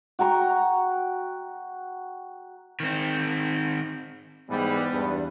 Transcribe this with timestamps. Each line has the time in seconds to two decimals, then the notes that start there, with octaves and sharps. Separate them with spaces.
0.19 F#4 G5 A#5 C#6
2.80 D#3 C4
4.50 G#2 E3 G3 B3
4.91 E2 G2